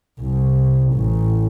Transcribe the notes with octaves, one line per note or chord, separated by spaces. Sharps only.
C2
A1